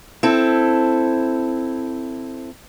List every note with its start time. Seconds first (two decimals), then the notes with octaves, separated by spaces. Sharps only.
0.23 C4 E4 A4